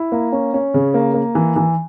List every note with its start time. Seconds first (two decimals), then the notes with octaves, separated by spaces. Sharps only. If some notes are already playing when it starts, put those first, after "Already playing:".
Already playing: E4
0.12 A#3
0.32 C#4
0.54 C#4
0.74 C#3
0.94 A#3
1.14 A#3
1.35 E3
1.56 E3